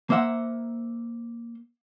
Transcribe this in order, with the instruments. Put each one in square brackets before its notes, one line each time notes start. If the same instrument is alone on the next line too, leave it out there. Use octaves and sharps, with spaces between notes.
[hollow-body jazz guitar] A#3 C5 E5 F#5